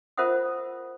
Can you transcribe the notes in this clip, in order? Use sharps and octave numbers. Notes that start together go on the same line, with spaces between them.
F4 A#4 C5 E5 F#5 D#6